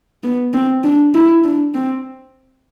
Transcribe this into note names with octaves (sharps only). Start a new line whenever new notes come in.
B3
C4
D4
E4
D4
C4